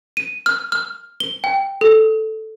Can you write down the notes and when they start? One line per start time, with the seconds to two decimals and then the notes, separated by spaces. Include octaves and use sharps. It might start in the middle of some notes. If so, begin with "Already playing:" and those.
0.17 D#7
0.46 F6
0.72 F6
1.20 G7
1.44 G5
1.81 A4